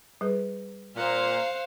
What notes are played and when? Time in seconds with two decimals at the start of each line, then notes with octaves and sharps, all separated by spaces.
0.21 G3 G#4 B4
0.96 A#2 C5 F5 F#5